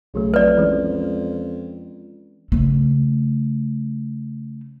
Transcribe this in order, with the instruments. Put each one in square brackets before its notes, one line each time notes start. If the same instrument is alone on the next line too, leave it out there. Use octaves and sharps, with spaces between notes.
[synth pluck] B1 F#3 A3 [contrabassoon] C#3
[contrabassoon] F2 [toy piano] B4 D5
[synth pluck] E3 G#3 C#4
[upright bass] C#3 A3